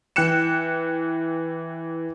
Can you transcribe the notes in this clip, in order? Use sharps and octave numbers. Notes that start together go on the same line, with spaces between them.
E3 G5 F#6 C#7 E7